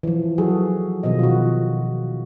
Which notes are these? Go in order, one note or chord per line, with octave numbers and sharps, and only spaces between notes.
E3 F3
F#3 F#4 G#4 A4
B2 D#3 F3 D#5
F4 F#4